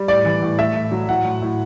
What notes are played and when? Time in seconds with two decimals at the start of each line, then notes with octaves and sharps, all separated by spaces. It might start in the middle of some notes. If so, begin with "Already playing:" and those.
Already playing: G3
0.08 A2 D5
0.25 E3
0.43 A2
0.59 A3 E5
0.75 A2
0.92 F#3
1.09 A2 F#5
1.25 A2
1.42 A2